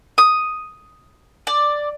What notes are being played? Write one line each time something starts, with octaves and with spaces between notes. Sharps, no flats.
D#6
D5